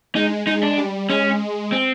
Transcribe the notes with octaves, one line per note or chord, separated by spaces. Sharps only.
G#3 D#4
G#3 D#4
D4
G3
G#3 C#4
C4